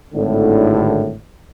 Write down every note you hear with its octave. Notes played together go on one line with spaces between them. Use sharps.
G#1 A2 D3